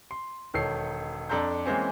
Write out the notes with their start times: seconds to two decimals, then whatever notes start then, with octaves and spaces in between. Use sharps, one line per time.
0.11 C6
0.54 E1 D#3 A4 C#5 C7
1.30 F2 D4 A4 A#5 C6 G6
1.66 E3 G#3 A#3 C4 C#4